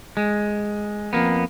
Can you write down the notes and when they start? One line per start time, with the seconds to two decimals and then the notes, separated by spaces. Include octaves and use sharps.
0.17 G#3
1.13 F2 A#3 B3